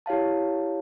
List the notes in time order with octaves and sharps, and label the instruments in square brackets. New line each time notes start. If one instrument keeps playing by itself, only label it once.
[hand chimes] E4 G4 C#5 F5 A5